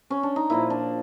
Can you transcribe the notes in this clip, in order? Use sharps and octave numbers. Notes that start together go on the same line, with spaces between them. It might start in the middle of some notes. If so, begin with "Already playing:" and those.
C#4
D4
D#4
A#2 F3 A#3 E4
D4